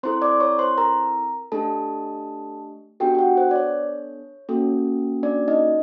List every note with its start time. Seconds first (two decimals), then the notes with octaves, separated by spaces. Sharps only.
0.03 C4 E4 A4 C5 C6
0.22 D5 D6
0.40 C#5 C#6
0.59 C5 C6
0.78 A#4 A#5
1.52 A3 D4 G4 A4 A5
3.00 B3 D4 F#4 G4 A4 G5
3.15 G5
3.19 F#4 F#5
3.37 C5
3.51 D5
3.56 C#5
4.49 A#3 C#4 F#4 A4
5.23 D4 D5
5.48 D#4 D#5